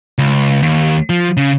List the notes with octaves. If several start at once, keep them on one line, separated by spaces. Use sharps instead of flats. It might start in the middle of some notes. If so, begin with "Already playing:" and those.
C#2
D#2
F3
C#3